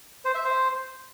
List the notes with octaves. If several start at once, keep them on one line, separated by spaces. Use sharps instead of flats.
C5
E5
C5